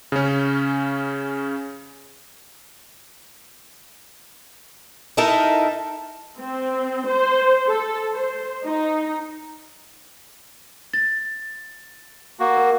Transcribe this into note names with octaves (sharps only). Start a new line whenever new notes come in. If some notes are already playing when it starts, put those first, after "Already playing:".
C#3 C#4
D#4 E4 A4 A#4
C4
C5
A4
C5
D#4
A6
A#3 F#4
A#4